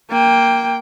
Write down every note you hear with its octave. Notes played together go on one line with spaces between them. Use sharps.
A#3 G5